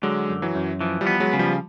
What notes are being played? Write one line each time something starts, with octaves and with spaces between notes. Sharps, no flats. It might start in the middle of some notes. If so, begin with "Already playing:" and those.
D3 F#3 G#3
F#2
E3 F#3
F#2
E3 F3
F3 G3
B3
F#3 G#3
C#3
F3 G3